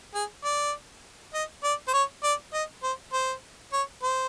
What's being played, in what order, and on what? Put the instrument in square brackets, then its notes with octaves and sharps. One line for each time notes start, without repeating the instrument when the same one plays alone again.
[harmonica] G#4
D5
D#5
D5
C5
C#5
D5
D#5
C5
C5
C#5
C5